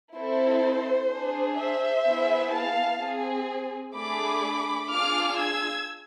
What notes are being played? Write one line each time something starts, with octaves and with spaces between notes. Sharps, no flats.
C4 E4 A4 C5
D4 G#4
C5 E5
B3 E4 G#4
F5 A5
C4 G#4
A3 D4 G#4 B5 D6
D4 F4 G#4 D6 F6
E6 G#6